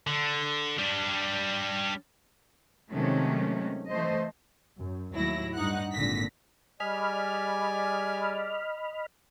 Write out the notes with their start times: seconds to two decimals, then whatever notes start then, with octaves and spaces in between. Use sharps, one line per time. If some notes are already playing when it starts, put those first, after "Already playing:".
0.07 D3
0.79 G3 D4
2.91 C3 D#3 F#3 G#3 A3 C#4
3.89 E3 A3 C5 D#5
4.78 F#2
5.14 D#2 A2 F#3 E4 A#6
5.55 G2 D#4 F#5 F#6
5.93 G#1 A#2 D3 A#6 B6
6.80 G3 G#4 D5 D#5 G#5 B5 F6